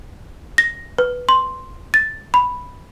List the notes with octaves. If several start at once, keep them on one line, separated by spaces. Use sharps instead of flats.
A#6
B4
C6
A6
B5